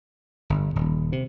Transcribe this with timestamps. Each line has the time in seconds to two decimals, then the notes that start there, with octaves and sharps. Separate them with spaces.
0.50 G1
0.76 D#1
1.12 C3